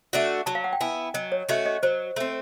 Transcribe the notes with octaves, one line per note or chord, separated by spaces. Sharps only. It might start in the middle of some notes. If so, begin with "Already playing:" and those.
A3 D4 F#4
F#3 A5
F5
F#5
G5
B3 E4 G#5
F#3 D#5
C#5
A3 C#4 F#4 D#5
D#5
F#3 C5
A3 C4